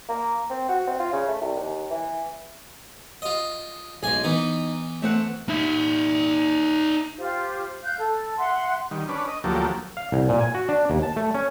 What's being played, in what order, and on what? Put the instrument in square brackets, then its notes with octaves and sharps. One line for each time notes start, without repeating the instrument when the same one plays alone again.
[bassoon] A#3
C4
F#4
C4
F4
C#3
A3
C2
D#2
E3
[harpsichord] F4 D#5
[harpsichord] B1 G#5 [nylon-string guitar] G#3 G#4
[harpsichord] E3 B3 [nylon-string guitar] D#4
[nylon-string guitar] A3 C4 F#5
[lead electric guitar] D#4 E5
[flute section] F4 G4 C5
F5 F#6 G6
A4
E5 F#5 C6
[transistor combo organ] D#3 G3
C#4 D4 B4
D#5
D2 F3 F#3 A#3 G4 A4
[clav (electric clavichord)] F5
C2
A#2
G#5
F#4
D4
D#2
A5
A3
C#4